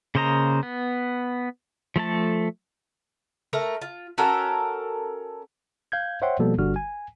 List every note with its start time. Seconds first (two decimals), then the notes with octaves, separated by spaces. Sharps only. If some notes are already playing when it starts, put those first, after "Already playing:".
0.15 C#3 A#3 C5 D#5 A#5
0.63 B3
1.96 F3 A3 A4 A5
3.53 A3 A#4 A#5
3.82 F4
4.18 C#4 F#4 A4 A#4
5.92 F5 G6 G#6
6.22 C5 C#5 E5 F#5 G5 C6
6.39 B2 F3 G3 A#3 B3 A4
6.58 G1 D3 G3 F#4 F6
6.76 G#5